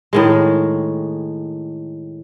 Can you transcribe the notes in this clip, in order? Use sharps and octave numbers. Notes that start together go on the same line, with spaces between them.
A2 D#3 G#3